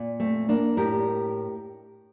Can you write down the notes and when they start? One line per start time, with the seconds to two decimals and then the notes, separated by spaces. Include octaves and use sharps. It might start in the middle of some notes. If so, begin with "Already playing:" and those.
Already playing: A#2
0.20 A3 C4
0.49 A#3 D4
0.77 A2 G4 A#4